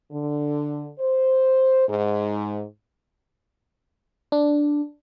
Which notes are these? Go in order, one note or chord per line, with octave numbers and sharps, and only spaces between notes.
D3
C5
G#2
D4